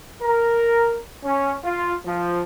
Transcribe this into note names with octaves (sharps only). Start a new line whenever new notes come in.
A#4
C#4
F4
F3